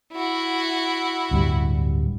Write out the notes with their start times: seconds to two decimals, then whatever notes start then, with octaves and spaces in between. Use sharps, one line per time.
0.12 E4 F#4
1.31 D1 G2 G3